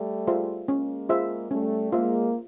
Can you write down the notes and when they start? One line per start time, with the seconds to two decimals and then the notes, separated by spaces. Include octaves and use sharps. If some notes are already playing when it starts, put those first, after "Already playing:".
Already playing: G3 A3
0.27 F4 G#4 C5 E5
0.68 G#3 A#3 C#4
1.09 F4 G#4 C5 E5
1.51 G3 A3 C#4
1.92 G#3 A#3 F4 G#4 C5 E5